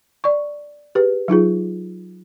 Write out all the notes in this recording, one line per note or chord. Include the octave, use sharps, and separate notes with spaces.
D5 C#6
G4 G#4 B4
F#3 D#4 F4 G#4